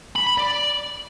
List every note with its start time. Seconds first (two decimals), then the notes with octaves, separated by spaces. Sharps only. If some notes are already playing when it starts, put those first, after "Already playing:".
0.16 B5
0.27 B5
0.38 D5